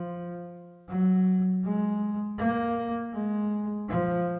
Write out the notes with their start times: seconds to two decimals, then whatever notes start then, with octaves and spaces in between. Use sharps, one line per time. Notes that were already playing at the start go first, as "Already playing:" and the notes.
Already playing: F3
0.88 F#3
1.64 G#3
2.38 A#3
3.13 G#3
3.88 F3